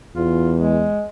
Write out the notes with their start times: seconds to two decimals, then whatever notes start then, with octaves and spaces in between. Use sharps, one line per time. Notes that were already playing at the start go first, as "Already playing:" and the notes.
0.16 E2 F4
0.60 G#3